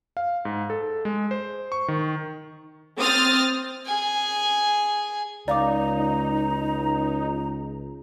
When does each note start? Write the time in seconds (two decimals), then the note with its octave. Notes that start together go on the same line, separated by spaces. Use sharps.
0.17 F5
0.45 G#2
0.70 A4
1.05 G#3
1.31 C5
1.72 C#6
1.88 D#3
2.99 C4 D#6 F6 A6
3.85 G#4 G#5
5.48 C#2 D#4 D5 F5 A#5 D6